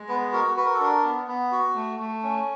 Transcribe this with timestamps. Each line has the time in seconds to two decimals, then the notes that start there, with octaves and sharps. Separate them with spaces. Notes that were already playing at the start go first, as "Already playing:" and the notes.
Already playing: G#3
0.08 B3 B4
0.32 F#4 A#4
0.57 F#4 B4
0.65 A#4
0.74 A4
0.80 D4 A#4
1.04 B3
1.27 B3
1.51 F#4
1.75 A3
1.99 A3
2.23 C#4